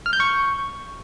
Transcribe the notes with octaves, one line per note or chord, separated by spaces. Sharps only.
F6
G6
C#6